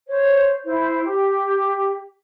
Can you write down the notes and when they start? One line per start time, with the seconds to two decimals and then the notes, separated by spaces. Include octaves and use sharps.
0.08 C5 C#5
0.65 E4 C5
1.04 G4